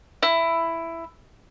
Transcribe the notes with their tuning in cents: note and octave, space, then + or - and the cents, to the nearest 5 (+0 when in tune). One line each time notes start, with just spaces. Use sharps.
E4 +10